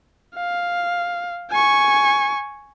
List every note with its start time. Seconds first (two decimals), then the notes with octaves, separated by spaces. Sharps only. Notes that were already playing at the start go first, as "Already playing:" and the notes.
0.35 F5
1.51 G#5 C#6